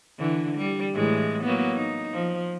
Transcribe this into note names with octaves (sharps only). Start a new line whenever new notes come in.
D3 E3
G3
A2 E3 G#3
F#3 A#3 B3
D#4
F3